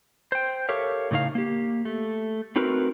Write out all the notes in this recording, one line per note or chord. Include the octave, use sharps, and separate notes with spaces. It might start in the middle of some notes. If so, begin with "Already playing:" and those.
C5 G5
G4 A4 A#4 C#5 E5 F5
A2 C#3 D#4 C5 F5
A#3 G4
A3
A3 C4 D#4 F#4 A#4 B4